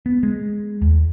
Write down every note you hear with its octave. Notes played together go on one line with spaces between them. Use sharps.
B3
G#3
D#2